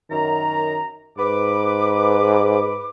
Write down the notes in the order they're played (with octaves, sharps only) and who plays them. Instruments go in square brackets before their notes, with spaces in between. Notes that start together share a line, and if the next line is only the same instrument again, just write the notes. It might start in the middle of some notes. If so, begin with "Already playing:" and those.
[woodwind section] F#2 A#5 [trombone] D#3
[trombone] G#2 [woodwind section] B4 D6